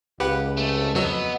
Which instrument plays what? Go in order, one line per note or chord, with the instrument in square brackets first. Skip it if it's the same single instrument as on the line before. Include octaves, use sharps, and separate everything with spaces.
[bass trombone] C#2 [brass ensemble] F4 D#5 F5 [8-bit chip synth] G4 B4 F#5
[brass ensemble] C3 [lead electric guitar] A3
[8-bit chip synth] F2 F#3 E6 [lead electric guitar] B3 [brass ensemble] D#5